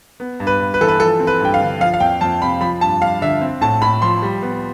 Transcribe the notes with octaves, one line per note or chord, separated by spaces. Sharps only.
B3
G2
B4
G2
B4
E3 A4
B4
F3 A4
C4
B4
G2 G5
F5
D3
F3 F5
F5
F2 G5
F2 A5
C3 B5
F3 B5
G2 A5
G2 F5
D3 E5
C4
A2 A5
A2 B5
F3 C6
G3
B3